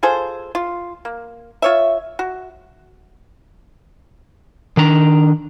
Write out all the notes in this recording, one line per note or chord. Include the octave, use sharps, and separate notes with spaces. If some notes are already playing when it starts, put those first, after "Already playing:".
F4 G#4 A4 C5
F4
A#3
F4 C#5 E5
F#4
D#3 D4 A#5